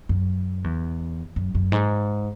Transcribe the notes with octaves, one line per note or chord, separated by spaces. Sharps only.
F#2
E2
F#2
F#2
G#2